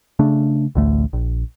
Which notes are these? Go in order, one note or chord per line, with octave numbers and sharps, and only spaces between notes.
C#3 A3 D4
A1 D2 D3 A3
A#1